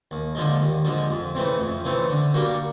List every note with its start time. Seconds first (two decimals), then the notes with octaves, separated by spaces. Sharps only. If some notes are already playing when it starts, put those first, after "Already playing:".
0.11 D#2
0.35 D3 F3 G#3
0.60 D#2
0.85 D3 F3 G#3
1.11 F2
1.35 C#3 E3 A3 C4
1.60 F2
1.85 C#3 E3 A3 C4
2.10 D3
2.34 G3 A#3 D4 F#4